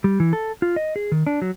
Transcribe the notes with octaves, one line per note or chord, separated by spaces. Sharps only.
G3
E3
A4
F4
D#5
G#4
D#3
D4
F#3